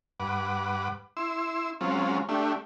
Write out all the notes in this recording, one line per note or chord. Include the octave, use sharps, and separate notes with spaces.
G2 B4 F#5 D6
E4 C6 E6
F#3 G#3 C4 C#4 F4
A3 D4 G4 E5